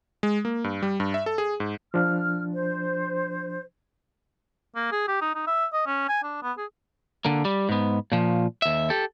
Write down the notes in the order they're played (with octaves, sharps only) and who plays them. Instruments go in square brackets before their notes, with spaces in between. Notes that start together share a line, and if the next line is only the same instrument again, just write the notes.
[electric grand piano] G#3
A#3
G2
G3
G2
E5
A4
G#4
G#2
[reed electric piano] F3 D4 [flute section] F6
[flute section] C5
[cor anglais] A#3
G#4
G4
D#4
D#4
E5
D#5
C#4
G#5
D4
B3
G#4
[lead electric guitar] D3 A#3
G3
G#2 B3
A#2 F3
D#2 E5
G4 A4